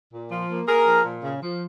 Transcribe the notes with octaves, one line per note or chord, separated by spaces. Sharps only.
A#2
F3
A#3
A#3 G#4 A#4
F3
A#2
C#3
F3